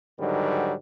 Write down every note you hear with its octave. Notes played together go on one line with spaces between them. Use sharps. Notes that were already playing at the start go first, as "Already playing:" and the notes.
G#2 D3 D#3 F#3 G3